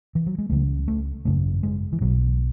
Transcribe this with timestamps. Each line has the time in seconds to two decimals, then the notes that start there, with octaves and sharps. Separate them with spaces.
0.15 E3
0.26 F#3
0.38 G#3
0.50 C#2 C#3 A3
0.88 A3
1.25 G#1 F#2 C#3 A3
1.63 G#3
1.93 E3
2.01 B1 B2 F#3